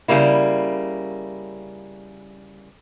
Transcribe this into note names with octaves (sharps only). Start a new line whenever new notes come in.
C#3 G3 A#3 E4